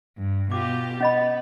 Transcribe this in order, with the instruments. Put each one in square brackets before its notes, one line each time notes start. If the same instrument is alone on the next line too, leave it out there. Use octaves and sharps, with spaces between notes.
[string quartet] G2
[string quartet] B2 F4 G4 [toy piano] D6
[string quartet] B3 [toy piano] C#4 D#5 B5